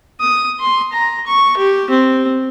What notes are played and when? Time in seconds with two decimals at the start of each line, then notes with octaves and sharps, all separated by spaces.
0.21 D#6
0.60 C6
0.93 A#5
1.27 C#6
1.57 G4
1.90 C4